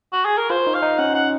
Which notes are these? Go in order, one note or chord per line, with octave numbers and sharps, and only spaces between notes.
F#4
G#4
A#4
F4 C5
D#4
F5
D#4
C#4 F#5
F#5